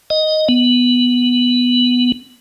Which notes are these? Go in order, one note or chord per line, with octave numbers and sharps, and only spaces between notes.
D#5
B3